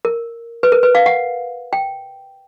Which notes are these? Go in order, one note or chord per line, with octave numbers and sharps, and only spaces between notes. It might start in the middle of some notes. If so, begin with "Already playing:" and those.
A#4
B4
A#4
B4
F5
F#5
G5